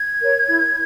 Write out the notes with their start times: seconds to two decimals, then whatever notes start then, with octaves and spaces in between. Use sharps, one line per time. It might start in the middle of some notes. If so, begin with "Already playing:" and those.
Already playing: G#6
0.20 A#4 C#5
0.48 E4